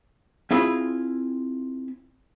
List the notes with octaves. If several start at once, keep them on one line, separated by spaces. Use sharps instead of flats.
C4 E4 F4 G#4 B5